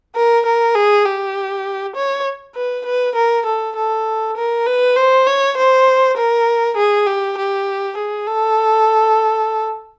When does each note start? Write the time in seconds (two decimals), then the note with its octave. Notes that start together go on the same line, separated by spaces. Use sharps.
0.15 A#4
0.46 A#4
0.75 G#4
1.05 G4
1.96 C#5
2.55 B4
2.86 B4
3.16 A#4
3.46 A4
3.76 A4
4.37 A#4
4.66 B4
4.96 C5
5.26 C#5
5.57 C5
6.17 A#4
6.77 G#4
7.06 G4
7.38 G4
7.97 G#4
8.27 A4